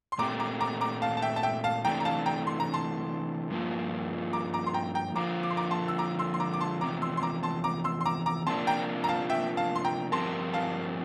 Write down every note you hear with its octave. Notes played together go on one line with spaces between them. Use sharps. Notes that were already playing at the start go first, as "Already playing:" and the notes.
C6
A#2 A3 C4 G4 A#5 D6
A#5 D6
A#5 D6
A#5 D6
F5 A5
A5
E5 G5
A5
E5 G5
F5 A5
C3 E3 A3 D4 G5 A#5
A#5
F5 A5
G5 A#5
C6
A#5
A5 C6
G2 F3 A#3 F4
A#5 D6
A#5 D6
C6
G5 A#5
G5 A#5
F2 D3 F3 A#3 F4 A#5 D6
D6
C6
A#5 D6
A5 C6
E6
A#5 D6
C6 E6
C6
A#5 D6
D6
A5 C6
E2 C3 F3 A#5 D6
C6 E6
C6
A#5 D6
A5 C6
A#5 D6
C6 E6
C6
A#5 D6
A#5 D6
C3 F3 A#3 D4 F4 A5 C6
G5 A#5
A#5
F5 A5
E5 G5
F5 A5
C6
G5 A#5
G2 F3 C4 G4 A#4 A5 C6
F5 A5